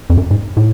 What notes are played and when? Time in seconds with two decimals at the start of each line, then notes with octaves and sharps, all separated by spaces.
0.10 F2
0.18 F#2
0.31 G#2
0.57 A2